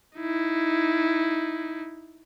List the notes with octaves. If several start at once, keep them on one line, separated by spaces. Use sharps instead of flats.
D#4 E4